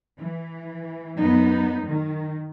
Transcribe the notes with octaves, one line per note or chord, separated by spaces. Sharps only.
E3
F#2 B3 D#4
D#3